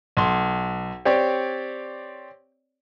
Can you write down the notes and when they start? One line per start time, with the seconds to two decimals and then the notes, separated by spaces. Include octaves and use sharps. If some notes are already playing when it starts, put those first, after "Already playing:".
0.17 B1 C6
1.05 C4 G4 C#5 D5